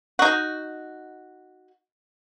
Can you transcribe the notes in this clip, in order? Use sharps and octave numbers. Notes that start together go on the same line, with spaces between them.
D#4 F#4